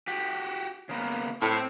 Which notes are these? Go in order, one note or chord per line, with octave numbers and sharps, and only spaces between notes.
F#4 G4
C#3 A#3 B3
A2 C4